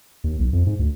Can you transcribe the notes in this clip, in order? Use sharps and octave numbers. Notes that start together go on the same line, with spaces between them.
D#2
B1
F2
G#2
D2